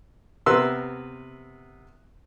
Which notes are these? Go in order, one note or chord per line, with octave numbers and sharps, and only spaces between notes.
C3 B3 A#4 B4 C6 E6